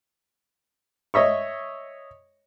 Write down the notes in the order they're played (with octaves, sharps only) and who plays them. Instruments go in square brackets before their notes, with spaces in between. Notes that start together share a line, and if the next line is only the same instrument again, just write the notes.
[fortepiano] C#5 D#5 E5 C#6